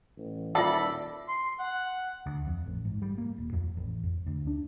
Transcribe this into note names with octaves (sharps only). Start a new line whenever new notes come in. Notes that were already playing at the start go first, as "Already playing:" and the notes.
A1
D#1 F4 A4 D5 E5 F#5 B5
C6
F#5
D2
F2
A1
G#2
G3
A#3
D#1
F2
A1
F2
D2
D4